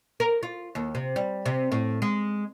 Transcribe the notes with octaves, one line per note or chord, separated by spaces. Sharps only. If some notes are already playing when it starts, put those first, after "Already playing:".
A#4
F4
D#2
C3
G3
C3
A2
G#3